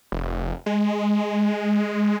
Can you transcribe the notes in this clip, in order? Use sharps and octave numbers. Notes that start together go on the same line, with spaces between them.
F1
G#3